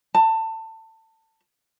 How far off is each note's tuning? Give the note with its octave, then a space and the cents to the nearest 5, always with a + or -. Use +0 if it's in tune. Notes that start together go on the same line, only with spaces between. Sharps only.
A5 +25